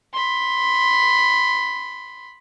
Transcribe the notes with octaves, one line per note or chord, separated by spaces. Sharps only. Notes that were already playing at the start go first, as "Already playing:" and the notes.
B5 C6